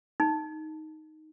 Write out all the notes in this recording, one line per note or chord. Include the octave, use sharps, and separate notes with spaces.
D#4